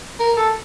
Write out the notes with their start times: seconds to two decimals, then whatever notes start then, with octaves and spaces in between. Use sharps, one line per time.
0.19 A#4
0.37 A4